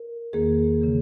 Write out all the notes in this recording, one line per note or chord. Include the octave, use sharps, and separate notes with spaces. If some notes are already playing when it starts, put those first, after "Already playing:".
Already playing: A#4
E2 D#3 A#3 G#4
C#3 E3